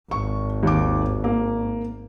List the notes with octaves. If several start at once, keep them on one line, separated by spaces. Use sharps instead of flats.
G#1 C#6
D#2 D6
A#3